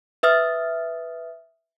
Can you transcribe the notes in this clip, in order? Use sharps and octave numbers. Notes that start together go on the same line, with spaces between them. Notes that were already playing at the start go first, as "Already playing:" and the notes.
B4 E5 D#6 F6 A6